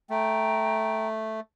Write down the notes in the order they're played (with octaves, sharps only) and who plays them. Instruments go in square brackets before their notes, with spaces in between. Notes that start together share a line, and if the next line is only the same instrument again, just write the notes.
[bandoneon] A3 [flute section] G5 A#5